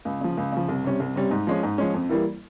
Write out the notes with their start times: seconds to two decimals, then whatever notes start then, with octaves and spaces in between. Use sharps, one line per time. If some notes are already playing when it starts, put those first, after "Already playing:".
0.05 C#2
0.21 C#3 F3
0.37 C#2
0.52 C#3 F3
0.68 C2
0.84 C3 G3 C#4
1.00 C2
1.16 C3 G3 C#4
1.31 G#2
1.47 F3 G#3 C#4
1.63 G#2
1.78 F3 G#3 C#4
1.94 F2
2.09 E3 G3 A#3 E4